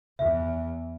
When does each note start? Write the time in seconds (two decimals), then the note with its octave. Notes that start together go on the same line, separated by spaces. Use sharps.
0.19 E2 E5